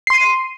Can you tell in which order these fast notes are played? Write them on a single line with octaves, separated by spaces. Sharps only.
C7 C6 D#7